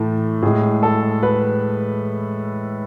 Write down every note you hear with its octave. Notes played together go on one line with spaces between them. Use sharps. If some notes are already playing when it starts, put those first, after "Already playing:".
Already playing: A2 E3 A3
A2 G#3 G#4
A4
B4